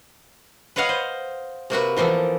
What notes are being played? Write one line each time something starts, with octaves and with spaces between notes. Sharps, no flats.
B4 C#5 D#5 F5 F#5
C5
C3 A#3 F#4 B4
E3 F3 A#3 B3 A4